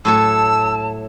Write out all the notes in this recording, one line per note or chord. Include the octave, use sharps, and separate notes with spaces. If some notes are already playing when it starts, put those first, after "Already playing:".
A2 F#3 A4 A5 E6